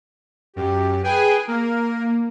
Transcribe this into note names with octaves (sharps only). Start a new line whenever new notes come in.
F#2 G4
G#4 B4 G5 G#5
A#3 A#4